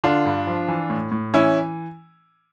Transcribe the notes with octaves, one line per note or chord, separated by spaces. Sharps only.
D3 D4 F4
G2
F3
E3
A2
A2
E3 C#4 E4